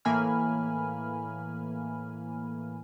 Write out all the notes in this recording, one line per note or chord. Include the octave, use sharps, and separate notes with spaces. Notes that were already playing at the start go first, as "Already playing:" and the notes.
A2 E3 A#3 G#5 B5 F6